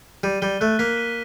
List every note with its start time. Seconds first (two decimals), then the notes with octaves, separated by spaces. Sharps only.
0.23 G3 D#7
0.42 G3 G7
0.61 A3 F#6
0.79 A#3 B6
0.98 D#7